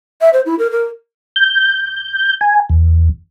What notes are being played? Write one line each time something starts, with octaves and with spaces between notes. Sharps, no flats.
E5
C5
E4
A#4
A#4
G6
G#5
E2